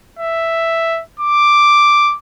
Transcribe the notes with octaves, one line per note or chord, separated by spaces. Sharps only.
E5
D6